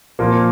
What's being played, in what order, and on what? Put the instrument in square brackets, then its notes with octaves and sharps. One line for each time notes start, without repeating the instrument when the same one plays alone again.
[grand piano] A#2 F3 A#3